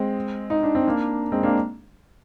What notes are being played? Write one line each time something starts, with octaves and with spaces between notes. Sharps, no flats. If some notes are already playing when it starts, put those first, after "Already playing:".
Already playing: G#3 C4
D#4
D4
C4
A#3 D4
G#3 C4
A#3 D4